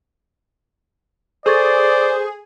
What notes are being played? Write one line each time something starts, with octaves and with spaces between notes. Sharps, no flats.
G#4 A4 C5 D5 C#6 A6